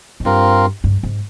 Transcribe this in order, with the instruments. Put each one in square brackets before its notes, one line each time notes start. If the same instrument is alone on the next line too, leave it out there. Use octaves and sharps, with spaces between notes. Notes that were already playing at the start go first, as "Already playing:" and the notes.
[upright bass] G#2
[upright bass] G2 [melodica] C4 F4 A#4
[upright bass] G2
G#2